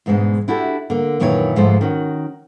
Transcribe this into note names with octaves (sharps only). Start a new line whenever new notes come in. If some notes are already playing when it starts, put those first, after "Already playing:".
E2 G#2 B2 G#3 D4
D4 E4 F#4 G4 A4
D3 A#3
F#2 A#2 D#3 E3 C#5
D2 G#2 F3 G#3 A4 C5
D#3 C#4 F#4